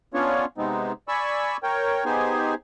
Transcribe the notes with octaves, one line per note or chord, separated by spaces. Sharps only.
B3 C#4 D4 F4 C#5
C3 G#3 B3 C4 D#4
D5 G#5 B5 C#6 E6
A#4 C#5 G5
B3 D#4 G4 G#4 C5 G#5